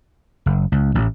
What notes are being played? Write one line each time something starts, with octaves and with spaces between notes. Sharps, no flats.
F#1
C#2
A1